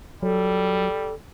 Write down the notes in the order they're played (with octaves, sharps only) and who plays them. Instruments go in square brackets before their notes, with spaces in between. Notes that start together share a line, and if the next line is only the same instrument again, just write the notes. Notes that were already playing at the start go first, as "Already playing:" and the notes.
[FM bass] F#3 [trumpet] G3 [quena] A4